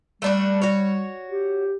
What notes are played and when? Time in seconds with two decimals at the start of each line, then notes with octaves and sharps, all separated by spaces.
0.22 G3 A3 D4 F#4
0.61 F#4 C#5
1.29 G4